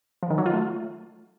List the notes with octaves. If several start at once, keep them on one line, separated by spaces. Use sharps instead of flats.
F3
D#3
F#3
F4
A3